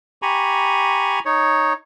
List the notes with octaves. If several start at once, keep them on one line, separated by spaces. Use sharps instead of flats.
G4 G#5 A#5 B5 C#6
D#4 C#5